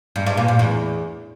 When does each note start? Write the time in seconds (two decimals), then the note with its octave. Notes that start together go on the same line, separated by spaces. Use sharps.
0.16 G2
0.26 G2
0.37 A#2
0.48 G2
0.59 E2